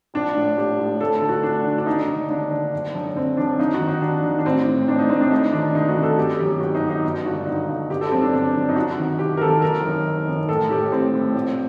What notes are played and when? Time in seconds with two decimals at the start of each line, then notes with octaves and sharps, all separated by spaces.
0.14 A#1 D4
0.35 A2
0.57 A#1 G4
0.79 A2
1.00 D2 A4
1.15 A4
1.22 D3
1.29 F#4
1.43 D2 D4
1.65 D3
1.78 D4
1.86 D#2 D#4
2.08 D3
2.29 D#2 D4
2.51 D3
2.73 F#1
2.94 F#2 D3
3.15 F#1 C4
3.37 F#2 D3 D4
3.59 D#2 D#4
3.74 F#4
3.80 D#3
3.87 D#4
4.02 D#2 D4
4.24 D#3
4.39 D4
4.45 A1 C4
4.66 A2
4.88 A1 D4
4.99 D#4
5.09 A2 C4
5.21 D4
5.32 D2 D#4
5.53 C3 D#3 D4
5.75 D2 D#4
5.89 F#4
5.96 C3 D#3
6.03 A4
6.18 G1 G4
6.39 F#2 D#3 G4
6.60 G1 F#4
6.75 D#4
6.82 F#2 D#3
6.90 D#4
7.04 G1
7.25 G2 D3 F#4
7.46 G1 D#4
7.69 G2 D3
7.90 G1 G4
8.01 A4
8.12 F#2 D3 C4
8.22 D4
8.33 G1 D4
8.55 F#2 D3
8.69 D#4
8.76 C2 F#4
8.98 C3 D#3
9.19 C2 G4
9.37 A#4
9.41 C3 D#3 A4
9.62 F#1 A#4
9.85 F#2 D#3
10.06 F#1
10.28 F#2 D#3
10.48 A1 A4
10.70 A2 G4
10.91 A1 C4
11.14 A2
11.35 A#1